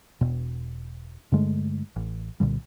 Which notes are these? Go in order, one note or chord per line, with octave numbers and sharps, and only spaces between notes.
E1 B2
G2 D3 G#3 A3
A1
C2 A#2 D3 G3